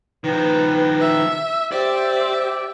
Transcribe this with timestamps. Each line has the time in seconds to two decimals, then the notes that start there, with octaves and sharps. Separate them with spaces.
0.24 D#3 F3 B4
1.01 E5
1.72 G4 C5 D5 E5